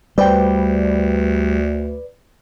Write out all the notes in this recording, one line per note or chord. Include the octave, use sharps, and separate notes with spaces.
D2 G3 B4 C5 D5 G5